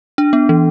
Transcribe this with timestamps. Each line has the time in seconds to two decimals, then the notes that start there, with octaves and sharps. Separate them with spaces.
0.18 D4
0.33 B3
0.49 E3